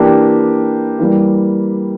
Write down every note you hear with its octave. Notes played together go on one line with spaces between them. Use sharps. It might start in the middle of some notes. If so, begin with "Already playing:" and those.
Already playing: E3 A#3 D4 G4
E3 G3 A#3